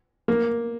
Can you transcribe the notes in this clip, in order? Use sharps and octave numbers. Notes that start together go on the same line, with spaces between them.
A#3